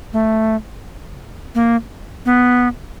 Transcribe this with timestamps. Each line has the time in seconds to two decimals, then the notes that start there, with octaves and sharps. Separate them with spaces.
0.13 A3
1.55 A#3
2.26 B3